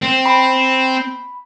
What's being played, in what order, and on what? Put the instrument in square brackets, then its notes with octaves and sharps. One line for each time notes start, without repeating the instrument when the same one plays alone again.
[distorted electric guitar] C4
[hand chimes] B5